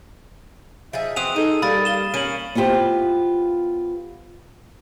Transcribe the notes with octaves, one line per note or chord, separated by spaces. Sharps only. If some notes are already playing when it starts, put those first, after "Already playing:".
F3 D#4 G#4 E5
E3 C4 F#4 D#6 D#7 F7
D#4 G#4 A4 D#7
G3 A#3 B5 D#6 A6
F5 E7 G7
A#3 C#4 D#7 F#7
B3 E4 F4 G4 C5